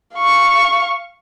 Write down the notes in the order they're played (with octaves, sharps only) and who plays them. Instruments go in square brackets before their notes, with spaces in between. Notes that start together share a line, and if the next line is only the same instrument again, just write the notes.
[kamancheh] F5 C#6